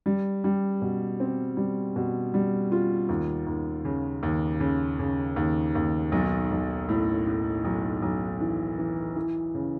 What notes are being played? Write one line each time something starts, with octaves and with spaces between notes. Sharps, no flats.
G3
G3
B2
C4
G3
B2
G3
F4
D#2
D#2
C#3
D#2
C#3
C#3
D#2
D#2
B1
B1
A2
A2
B1
B1
E3
E3
E3
C#3